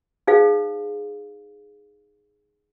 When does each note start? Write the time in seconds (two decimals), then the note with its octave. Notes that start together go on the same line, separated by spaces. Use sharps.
0.27 D#4 G#4 C5 F5